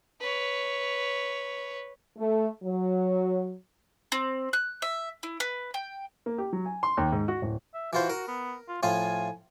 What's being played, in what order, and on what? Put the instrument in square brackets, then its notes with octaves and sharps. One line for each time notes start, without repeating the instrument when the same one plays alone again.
[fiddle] B4 C#5
[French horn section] A3
F#3
[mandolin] C4
F#6
E5
E4
B4
G5
[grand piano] A#3
G4
F#3
G#5
C6
D#2
G#2
F#4
D1
[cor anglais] E5
[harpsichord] E3 F4 C5 [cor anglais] F#4
[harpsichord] A#4
[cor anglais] B3
F4
[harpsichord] A2 F3 F4 [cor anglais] G#5